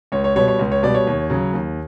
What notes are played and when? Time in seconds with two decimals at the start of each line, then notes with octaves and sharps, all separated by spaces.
0.12 C#2 C#5
0.24 C#5
0.36 B2 G3 C#5
0.48 C#5
0.59 C#2
0.72 C#5
0.83 B2 G3 D5
0.94 C#5
1.07 D#2
1.30 C#3 F#3
1.54 D#2